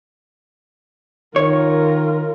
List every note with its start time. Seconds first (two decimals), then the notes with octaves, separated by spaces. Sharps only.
1.36 D#3 F4 A#4 C#5